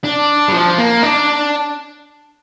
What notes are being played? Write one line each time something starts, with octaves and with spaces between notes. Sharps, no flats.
D4
G3
F3
A#3
D4